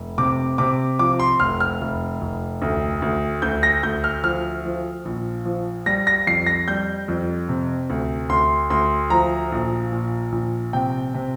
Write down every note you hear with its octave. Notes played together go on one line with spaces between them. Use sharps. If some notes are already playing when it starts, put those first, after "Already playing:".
Already playing: F1
C3 D6
C3 D6
F3 D6
C6
F1 F6
F6
F1
F1
D2
D2
D2 G6
A#6
D2 G6
F6
F3 F6
F3
A#1
F3
G3 A#6
A#6
F2 C7
A#6
G3 G6
F2
C3
D2
D2 C6
D2 C6
F3 A#5
A#1
A#2
A#1
C3 G5
C3